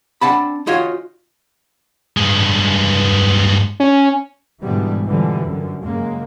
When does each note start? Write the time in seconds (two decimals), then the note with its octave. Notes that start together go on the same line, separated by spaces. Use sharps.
0.21 C4 D4 F#5 A5 B5
0.67 D#4 F4 F#4 C#5 D#5
2.17 G2 G#3
3.80 C#4
4.62 G#2 B2 D3 E3 G3 G#3
5.06 B2 D3 E3 F3 G3
5.45 F#2 D3
5.83 F#2 C#3 G#3 A#3